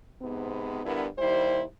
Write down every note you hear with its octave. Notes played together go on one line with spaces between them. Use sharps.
G#2 C3 B3
G2 D3 B3 E4 A#4
D#2 G3 E4 C5